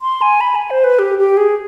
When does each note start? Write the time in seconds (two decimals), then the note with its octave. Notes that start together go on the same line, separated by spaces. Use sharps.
0.02 C6
0.22 G#5
0.41 B5
0.55 G#5
0.71 C5
0.84 B4
0.99 G4
1.18 G4
1.37 G#4